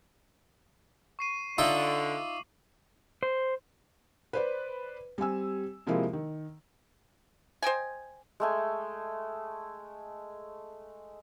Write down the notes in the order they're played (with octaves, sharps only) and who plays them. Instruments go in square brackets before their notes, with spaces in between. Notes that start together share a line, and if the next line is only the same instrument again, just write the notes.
[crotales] C#6 C7 D#7
[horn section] D3 [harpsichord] D#4 F4 E5 [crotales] D6 F#7
[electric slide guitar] C5
[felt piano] B4 C5 D5
G3 C4 G#5 E6
C3 F3 G#3 A#3 E4
D#3
[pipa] C5 D#5 G5 G#5
[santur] G#3 A3 G#5